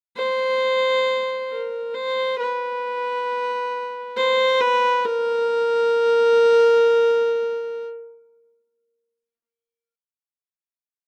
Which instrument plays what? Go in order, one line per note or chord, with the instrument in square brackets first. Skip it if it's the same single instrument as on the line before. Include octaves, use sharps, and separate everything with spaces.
[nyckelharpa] C5
A#4
C5
B4
C5
B4
A#4